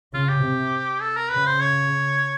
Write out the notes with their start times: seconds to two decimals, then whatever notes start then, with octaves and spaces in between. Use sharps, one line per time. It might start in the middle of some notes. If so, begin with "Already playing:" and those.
0.14 C#3 F4
0.29 G4
0.43 C3
1.01 A4
1.16 A#4
1.30 C#3 B4
1.46 C5
1.60 C#5